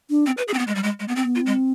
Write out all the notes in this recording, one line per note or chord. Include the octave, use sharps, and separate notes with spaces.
D4
C4
B4
G#4
C4
B3
G#3
G3
G#3
G#3
B3
C4
B3
F4
C4
G#3